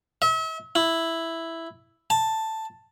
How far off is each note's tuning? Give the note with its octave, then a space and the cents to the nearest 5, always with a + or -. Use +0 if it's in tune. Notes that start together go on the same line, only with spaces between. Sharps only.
E5 -40
E4 +0
A5 +5